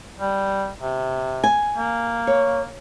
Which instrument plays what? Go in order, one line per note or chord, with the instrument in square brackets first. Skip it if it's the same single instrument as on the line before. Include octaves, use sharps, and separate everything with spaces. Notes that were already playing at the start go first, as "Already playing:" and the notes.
[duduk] G3
C3
[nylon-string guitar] G#5
[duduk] A#3
[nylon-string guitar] C#5